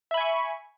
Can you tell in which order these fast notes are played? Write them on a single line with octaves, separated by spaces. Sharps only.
E5 B5 G#5 C#6